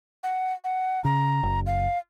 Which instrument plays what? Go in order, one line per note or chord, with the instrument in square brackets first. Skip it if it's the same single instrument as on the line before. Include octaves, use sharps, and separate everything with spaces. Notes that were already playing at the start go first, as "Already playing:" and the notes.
[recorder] F#5
F#5
[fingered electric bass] C#3 [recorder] A#5
[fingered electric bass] F#1
[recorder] F5